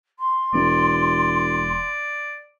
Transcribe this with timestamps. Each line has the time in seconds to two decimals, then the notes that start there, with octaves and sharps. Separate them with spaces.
0.19 C6
0.53 E1 D5